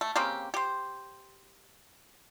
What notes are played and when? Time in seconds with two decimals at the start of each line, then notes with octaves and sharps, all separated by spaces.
0.01 A3
0.16 C#3 A#3 C4 G4
0.54 G4 C5